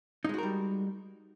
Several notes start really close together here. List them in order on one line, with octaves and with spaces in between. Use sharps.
D#4 G#3 F#4 A#4 G3